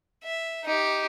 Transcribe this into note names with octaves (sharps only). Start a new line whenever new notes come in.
E5
D#4 G4